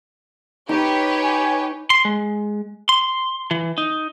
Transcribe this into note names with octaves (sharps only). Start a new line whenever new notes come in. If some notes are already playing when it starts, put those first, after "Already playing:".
D#4 G4 B4 C#5
G#5
C6
G#3
C6
E3
D#4